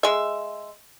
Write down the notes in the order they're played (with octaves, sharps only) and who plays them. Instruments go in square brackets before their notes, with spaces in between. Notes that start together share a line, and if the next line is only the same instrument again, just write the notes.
[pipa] G#3 E5